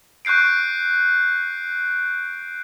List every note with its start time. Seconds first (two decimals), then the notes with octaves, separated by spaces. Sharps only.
0.25 C#6 F#6 G6 C7 D7